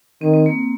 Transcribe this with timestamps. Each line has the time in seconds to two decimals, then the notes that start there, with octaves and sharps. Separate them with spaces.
0.21 D#3 C4
0.34 C4
0.46 A#3